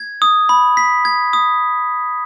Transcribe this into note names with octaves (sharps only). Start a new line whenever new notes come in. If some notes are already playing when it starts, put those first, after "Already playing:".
Already playing: G#6
D#6
B5
B6
G#6
D#6